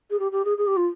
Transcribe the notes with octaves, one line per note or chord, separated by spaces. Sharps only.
G#4
G4
G4
G#4
G#4
G4
F4